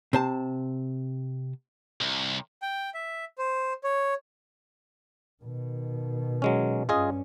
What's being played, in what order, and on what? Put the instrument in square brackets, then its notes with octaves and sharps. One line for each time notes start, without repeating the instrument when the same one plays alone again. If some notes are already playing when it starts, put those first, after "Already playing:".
[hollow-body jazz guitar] C3 C5 A5
[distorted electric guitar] C2
[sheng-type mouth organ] G5
E5
C5
C#5
[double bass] B2 D#3
[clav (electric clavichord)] F#3 G#3 C#4
[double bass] G2 C#4 [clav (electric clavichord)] F4 G#4 D#5